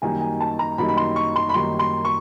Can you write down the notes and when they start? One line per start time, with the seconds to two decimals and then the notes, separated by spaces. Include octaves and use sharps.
0.02 F#2 D#3 G3 A#3 D#4 G#5
0.21 G#5
0.40 A5
0.59 A#5
0.78 F#2 D#3 G3 A#3 D#4 B5
0.88 B5
0.97 C6
1.16 C#6
1.36 C6
1.49 B5
1.54 F#2 D#3 G3 A#3 D#4 C6
1.79 C6
2.05 C#6